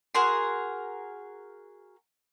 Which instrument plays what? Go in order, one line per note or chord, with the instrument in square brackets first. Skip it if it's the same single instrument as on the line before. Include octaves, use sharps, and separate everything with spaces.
[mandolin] F#4 G#4 A#4 C6